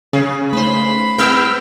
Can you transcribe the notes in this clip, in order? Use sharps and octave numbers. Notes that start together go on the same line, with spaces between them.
C#3 G#4
A3 D#4 B4 C5 B5
G3 B3 C4 E4 B4 E6 F6 G6